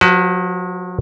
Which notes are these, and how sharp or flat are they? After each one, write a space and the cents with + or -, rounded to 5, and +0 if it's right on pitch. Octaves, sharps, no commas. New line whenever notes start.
F#3 -45 F#4 +30 B4 +30